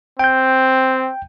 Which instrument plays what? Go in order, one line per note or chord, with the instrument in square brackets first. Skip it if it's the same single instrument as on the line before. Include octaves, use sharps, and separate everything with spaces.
[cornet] C4 [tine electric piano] G5 G6